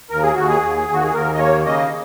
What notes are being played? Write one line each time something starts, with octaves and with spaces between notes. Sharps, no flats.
D#2 A#4
G#4
D#2 F#4
G#4
D#2
D#2
F#4
G#4
D#2 A#4
D#5
A#3 C#5
C#3 D#5